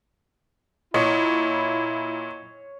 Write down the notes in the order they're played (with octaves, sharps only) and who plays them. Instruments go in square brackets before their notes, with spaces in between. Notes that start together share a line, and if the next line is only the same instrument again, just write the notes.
[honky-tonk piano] A#2 [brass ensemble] E4 [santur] C#5 [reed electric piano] D#5